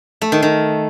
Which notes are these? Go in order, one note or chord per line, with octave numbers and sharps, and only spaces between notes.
A3
D#3
D#3